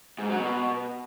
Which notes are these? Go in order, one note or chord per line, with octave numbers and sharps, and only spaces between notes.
G#2
F#3
B2